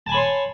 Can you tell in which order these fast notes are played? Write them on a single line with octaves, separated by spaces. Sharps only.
A5 G#5 B5 C#5 C6